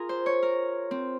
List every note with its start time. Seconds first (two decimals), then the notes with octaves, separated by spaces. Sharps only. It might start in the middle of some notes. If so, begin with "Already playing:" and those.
Already playing: F4 G#4 A#4
0.09 C5
0.26 C#5
0.42 A#4
0.91 C4